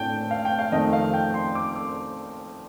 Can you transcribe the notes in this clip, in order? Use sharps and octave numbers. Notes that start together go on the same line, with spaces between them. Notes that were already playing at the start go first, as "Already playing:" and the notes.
Already playing: A2 A3 D4 G5 A5
F5
G5
F5
F2 D#3 A3 D#5
F5
G5
C6
D6
D6